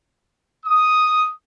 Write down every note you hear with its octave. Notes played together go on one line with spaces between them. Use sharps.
D#6